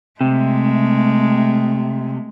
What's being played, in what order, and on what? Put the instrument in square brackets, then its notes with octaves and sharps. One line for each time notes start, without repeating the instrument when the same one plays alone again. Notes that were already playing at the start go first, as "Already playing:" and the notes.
[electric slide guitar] C3 [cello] G#3 A3